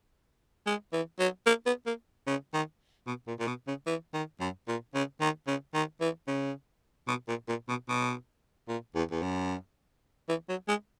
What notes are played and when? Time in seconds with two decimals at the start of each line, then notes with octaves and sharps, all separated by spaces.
0.66 G#3
0.93 E3
1.19 F#3
1.46 A#3
1.66 B3
1.86 A#3
2.27 C#3
2.53 D#3
3.07 B2
3.27 A#2
3.40 A#2
3.47 B2
3.67 C#3
3.87 E3
4.14 D#3
4.41 F#2
4.68 A#2
4.95 C#3
5.21 D#3
5.47 C#3
5.74 D#3
6.01 E3
6.28 C#3
7.08 B2
7.28 A#2
7.48 A#2
7.69 B2
7.89 B2
8.69 A#2
8.95 E2
9.11 E2
9.22 F#2
10.29 E3
10.49 F#3
10.68 G#3